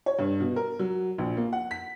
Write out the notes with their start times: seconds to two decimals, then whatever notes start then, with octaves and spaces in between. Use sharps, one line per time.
0.06 C#5
0.19 G2
0.40 B2
0.56 A#4
0.79 F#3
1.18 A#1
1.37 A#3
1.53 F#5
1.71 B6